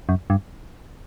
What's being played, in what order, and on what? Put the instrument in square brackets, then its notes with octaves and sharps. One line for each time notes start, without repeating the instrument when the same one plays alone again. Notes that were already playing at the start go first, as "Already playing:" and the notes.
[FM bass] F#2
G2